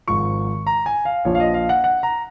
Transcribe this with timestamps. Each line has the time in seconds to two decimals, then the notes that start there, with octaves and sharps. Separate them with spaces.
0.08 G#1 G#2 F3 C#6
0.67 A#5
0.86 G#5
1.05 F5
1.25 A#1 A#2 F3 C#5
1.35 F5
1.40 D#5
1.54 F5
1.69 F#5
1.84 F#5
2.03 A#5